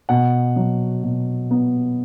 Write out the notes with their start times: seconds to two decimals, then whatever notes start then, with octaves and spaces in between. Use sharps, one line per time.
0.09 B2 F#5
0.56 F#3
1.03 B2
1.51 B3